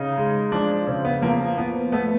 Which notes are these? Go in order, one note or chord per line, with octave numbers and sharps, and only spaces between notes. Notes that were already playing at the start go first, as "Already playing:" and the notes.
Already playing: C#3 D#4
G#3
F3 D4
C#3 C4
B3
F3 A#3
F3 B3
A3 B3